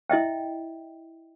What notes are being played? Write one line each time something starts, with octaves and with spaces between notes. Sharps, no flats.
E4 D#5 E5 G5